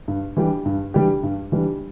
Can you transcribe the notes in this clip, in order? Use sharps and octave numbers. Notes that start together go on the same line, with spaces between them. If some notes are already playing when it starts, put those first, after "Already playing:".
G2
E3 G3 D4 G4
G2
E3 G3 D4 G4
G2
E3 G3 D4 G4